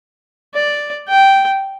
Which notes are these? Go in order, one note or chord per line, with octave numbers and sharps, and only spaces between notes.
D5
G5